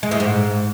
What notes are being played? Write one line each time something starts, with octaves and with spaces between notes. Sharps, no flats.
G#3
A2
G#2